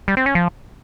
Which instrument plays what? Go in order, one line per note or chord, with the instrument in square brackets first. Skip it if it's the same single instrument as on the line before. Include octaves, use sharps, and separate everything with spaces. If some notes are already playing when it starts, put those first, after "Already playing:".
[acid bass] G3
C4
C#4
F3